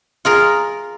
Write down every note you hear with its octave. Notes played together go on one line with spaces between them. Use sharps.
F4 G#4 A#4